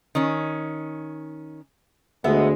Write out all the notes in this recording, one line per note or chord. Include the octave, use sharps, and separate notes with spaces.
D#3 C#4
D2 G#3 B3 E5